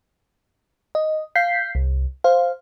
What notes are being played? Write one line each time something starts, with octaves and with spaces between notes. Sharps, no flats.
D#5
F5 G6 B6 C7
C2
C5 F5